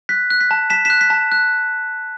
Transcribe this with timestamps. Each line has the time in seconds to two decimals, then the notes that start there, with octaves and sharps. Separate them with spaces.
0.09 F#6 B6
0.30 F#6
0.41 B6
0.51 A5
0.70 A5 B6 E7
0.85 F#6 B6 E7
1.01 B6
1.10 A5
1.32 F#6